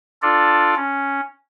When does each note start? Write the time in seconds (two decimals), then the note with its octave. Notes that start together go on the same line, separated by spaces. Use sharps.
0.22 D4 F4 A4 D5
0.76 C#4